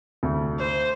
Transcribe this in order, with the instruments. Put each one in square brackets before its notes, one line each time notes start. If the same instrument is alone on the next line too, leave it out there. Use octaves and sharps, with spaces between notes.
[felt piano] D2
[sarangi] C5